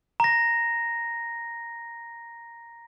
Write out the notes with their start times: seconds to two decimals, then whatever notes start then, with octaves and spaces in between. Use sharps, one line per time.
0.20 A#5 A#6